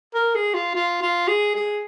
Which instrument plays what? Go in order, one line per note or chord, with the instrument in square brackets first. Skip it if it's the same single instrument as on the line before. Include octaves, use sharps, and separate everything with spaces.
[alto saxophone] A#4
G#4
F4
F4
F4
G#4
G#4